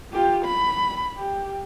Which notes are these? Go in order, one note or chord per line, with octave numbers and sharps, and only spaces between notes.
F4 G4
B5
G4